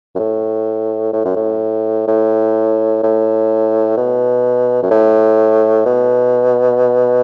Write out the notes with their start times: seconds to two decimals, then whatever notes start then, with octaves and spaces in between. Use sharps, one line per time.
0.15 F#2
0.19 A2
1.13 A2
1.25 F#2
1.36 A2
2.07 A2
3.03 A2
3.97 B2
4.82 F#2
4.91 A2
5.86 B2